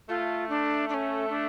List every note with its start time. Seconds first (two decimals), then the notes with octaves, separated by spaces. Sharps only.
0.09 A3 F4
0.49 D4
0.89 D4
0.94 C#4
1.30 D4